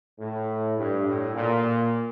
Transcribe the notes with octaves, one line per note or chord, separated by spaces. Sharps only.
A2
G2
A2
A#2